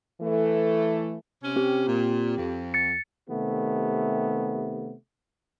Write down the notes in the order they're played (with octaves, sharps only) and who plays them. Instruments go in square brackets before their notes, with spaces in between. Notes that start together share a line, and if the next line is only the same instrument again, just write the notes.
[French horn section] E3 A3
[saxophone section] C3 C#4
[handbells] C4 G4
[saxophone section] A#2
F2
[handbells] A6 C#7
[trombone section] C3 D#3 A3 B3 G4